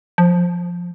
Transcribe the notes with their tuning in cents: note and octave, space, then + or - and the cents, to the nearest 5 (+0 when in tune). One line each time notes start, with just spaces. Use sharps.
F3 +10